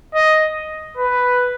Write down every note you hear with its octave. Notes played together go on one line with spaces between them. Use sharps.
D#5
B4